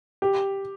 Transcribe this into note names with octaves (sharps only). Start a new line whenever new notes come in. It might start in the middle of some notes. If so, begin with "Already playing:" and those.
G4